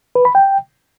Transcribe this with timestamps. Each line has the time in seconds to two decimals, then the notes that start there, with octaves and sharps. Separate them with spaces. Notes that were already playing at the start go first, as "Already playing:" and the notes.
0.15 B4
0.25 B5
0.35 G5